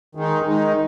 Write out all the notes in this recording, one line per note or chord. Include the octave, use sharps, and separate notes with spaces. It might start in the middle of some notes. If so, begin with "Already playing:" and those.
D#3 G#3 D#4
D#3 G#3 D#4